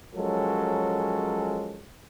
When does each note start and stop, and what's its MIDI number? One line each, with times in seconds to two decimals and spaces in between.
0.15 1.86 53
0.15 1.86 54
0.15 1.86 56
0.15 1.86 61
0.15 1.86 69
0.15 1.86 70